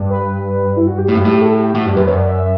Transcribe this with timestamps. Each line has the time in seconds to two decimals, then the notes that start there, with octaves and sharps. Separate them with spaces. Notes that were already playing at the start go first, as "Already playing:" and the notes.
Already playing: G2
0.10 B4
0.77 E4
0.87 F#4
0.98 G4
1.08 A2 F#4
1.17 G2
1.20 G4
1.25 A2
1.31 G4
1.42 A4
1.53 G4
1.63 G4
1.75 A2 F#4
1.86 G2 G4
1.97 F#2 B4
2.07 F#2 C#5
2.18 D5
2.29 E5